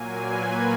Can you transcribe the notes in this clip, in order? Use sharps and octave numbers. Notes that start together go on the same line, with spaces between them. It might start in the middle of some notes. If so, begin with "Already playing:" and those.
Already playing: A#2 F#3 A#3 G#5
B4